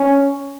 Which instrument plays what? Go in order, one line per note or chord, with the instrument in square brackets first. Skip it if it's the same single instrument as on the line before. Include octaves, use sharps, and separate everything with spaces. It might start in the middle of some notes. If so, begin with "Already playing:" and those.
Already playing: [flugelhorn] C#4